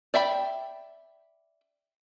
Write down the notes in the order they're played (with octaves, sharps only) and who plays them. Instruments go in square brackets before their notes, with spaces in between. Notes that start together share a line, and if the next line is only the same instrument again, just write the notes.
[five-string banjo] D5 E5 G5 B5